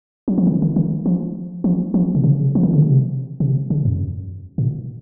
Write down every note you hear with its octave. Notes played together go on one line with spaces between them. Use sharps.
F#3
F3
D#3
D#3
D#3
F3
F3
F3
C3
C#3
F3
D#3
C#3
C3
C3
C#3
F#2
A#2